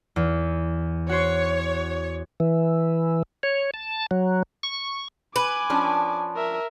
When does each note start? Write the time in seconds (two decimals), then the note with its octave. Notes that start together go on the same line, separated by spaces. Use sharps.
0.16 E2
1.09 F#4 C5 C#5
2.40 E3
3.43 C#5
3.74 A5
4.11 F#3
4.63 C#6
5.36 B4 G#5 D6
5.70 F3 C#4 D4
6.36 A#4 E5